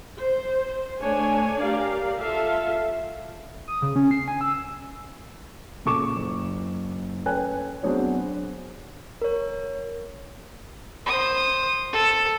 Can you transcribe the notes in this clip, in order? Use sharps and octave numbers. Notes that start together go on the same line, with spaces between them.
C5
A3 D4 C#5 G#5
G4 A#4 D5 F5
F4 A4 E5 F5
D#6
C#3
C#4
C7
G#5
E6
A#2 C#3 A4 C#6 D6 E7
F#1
C#4 A4 B4 G5 G#5 F#6
F#3 B3 C4 D4 G#4 C#5
A#4 C#5
C5 D#6
A4